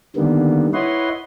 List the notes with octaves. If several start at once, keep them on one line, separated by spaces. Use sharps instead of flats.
D3 D#3 G3 A#3 B3
E4 B4 C#5 D#5 F#5 C6